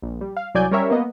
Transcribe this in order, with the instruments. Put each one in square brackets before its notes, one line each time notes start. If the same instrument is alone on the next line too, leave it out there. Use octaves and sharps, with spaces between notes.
[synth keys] A#1
G3
F5
C2 F#3 D5 G#5 G6
G3 C#4 A#4 C#5 E5
A#3 B3 D#5